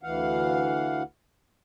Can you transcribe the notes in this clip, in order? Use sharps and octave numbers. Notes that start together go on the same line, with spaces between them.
D2 E3 F5 F#5